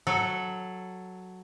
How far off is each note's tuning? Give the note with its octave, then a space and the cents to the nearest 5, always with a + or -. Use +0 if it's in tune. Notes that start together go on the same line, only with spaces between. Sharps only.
F#3 +0 A4 +0